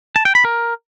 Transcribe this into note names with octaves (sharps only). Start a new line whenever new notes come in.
A5
G5
B5
A#4